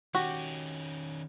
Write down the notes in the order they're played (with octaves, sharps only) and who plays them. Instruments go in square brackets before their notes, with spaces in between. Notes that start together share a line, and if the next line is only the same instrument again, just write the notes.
[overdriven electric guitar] D#3 C#4 [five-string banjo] F#4 G4